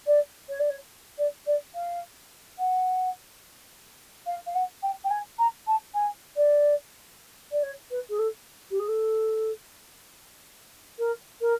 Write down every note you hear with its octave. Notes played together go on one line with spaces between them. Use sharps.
D5
C#5
D5
C#5
D5
D5
F5
F#5
F5
F5
F#5
G5
G5
G#5
A#5
A5
G#5
D5
D5
C#5
B4
G#4
A4
G4
G#4
A4
A#4
A#4